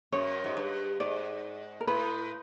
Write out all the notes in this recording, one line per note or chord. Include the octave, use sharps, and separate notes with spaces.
F#2 C#5
G#2
G2
G#2 D5
A#4
A2 B4